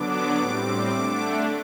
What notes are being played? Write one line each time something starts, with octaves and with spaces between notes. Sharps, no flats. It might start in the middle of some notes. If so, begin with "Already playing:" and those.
Already playing: D3 F#3 B3 D4 D6
A2 G3 C4
D3 A3 D4